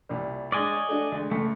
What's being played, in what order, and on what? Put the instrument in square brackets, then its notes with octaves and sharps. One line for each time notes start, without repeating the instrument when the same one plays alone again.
[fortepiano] C2 A#2 G3
[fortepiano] G#3 D4 [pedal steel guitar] D5 D#5 G#5
[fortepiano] C#5
A3 D4 F#4
D2 G#3
[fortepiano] C#2 [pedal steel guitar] A3